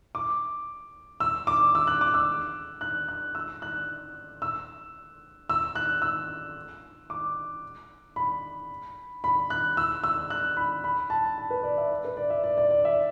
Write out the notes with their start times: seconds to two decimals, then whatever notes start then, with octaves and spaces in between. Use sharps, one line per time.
0.15 D6
1.20 E6
1.47 D6
1.75 E6
1.87 F#6
2.01 D6
2.14 E6
2.81 F#6
3.08 F#6
3.35 E6
3.62 F#6
4.42 E6
5.49 E6
5.75 F#6
6.02 E6
7.10 D6
8.16 B5
9.24 B5
9.50 F#6
9.77 E6
10.04 E6
10.30 F#6
10.57 B5
10.84 B5
11.10 A5
11.38 A5
11.50 B4
11.63 D5
11.78 E5
12.05 B4
12.17 D5
12.30 E5
12.44 D5
12.58 D5
12.71 D5
12.85 E5